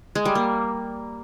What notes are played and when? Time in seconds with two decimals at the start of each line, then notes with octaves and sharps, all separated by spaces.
0.15 G#3
0.25 G3
0.35 A#3